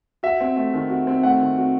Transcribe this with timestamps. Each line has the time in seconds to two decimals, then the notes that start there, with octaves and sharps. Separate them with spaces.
0.23 F#4 E5
0.41 C4
0.56 A3
0.74 D#3
0.90 F#4
1.07 C4
1.23 A3 F#5
1.41 D#3
1.58 F#4